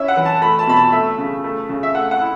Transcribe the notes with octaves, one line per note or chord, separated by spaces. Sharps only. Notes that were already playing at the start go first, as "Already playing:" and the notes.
Already playing: C#4 E4 E5
F#5
E3
A5
A3 B5
A5
B2 B5
A5
A3 E5
C#3
A3
C#3
E5
A3 F#5
F#5
E4